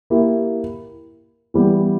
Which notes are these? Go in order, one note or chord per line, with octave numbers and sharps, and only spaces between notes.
A#3 E4 G4
E3 G3 B3 G4